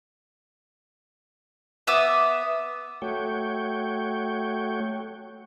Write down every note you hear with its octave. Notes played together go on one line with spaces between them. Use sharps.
B3 E5 D6 D#6
A3 F#4 C#5 G5